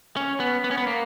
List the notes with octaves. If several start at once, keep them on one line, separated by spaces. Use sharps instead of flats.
C#4
B3
B3
C#4
B3
A#3